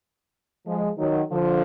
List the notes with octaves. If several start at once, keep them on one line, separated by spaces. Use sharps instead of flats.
F3 G#3
D#3 F#3
D3 F3